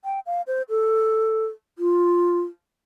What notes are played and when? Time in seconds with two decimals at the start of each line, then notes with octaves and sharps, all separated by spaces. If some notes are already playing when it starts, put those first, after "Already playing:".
0.05 G5
0.26 F5
0.47 C5
0.69 A4
1.79 F4